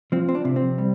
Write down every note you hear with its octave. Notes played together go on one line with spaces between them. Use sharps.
F3 C4
C4
D4
C3
C4
G3